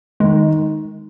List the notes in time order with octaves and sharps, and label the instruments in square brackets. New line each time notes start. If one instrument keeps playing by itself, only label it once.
[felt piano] D#3 [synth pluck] G#3